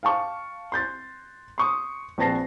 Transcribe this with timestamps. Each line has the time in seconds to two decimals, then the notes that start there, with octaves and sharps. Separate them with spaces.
0.03 F5 G5 A5 C#6 D6
0.72 C6 G6 A6
1.58 C6 C#6 D#6
2.18 A#1 C4 B4 A5 A#6 C7